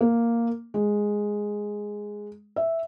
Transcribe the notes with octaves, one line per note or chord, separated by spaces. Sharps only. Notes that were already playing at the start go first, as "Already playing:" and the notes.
A#3
G#3
E5